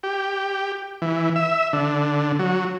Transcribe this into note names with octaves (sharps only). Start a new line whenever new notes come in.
G4
E3
E5
D3
F#3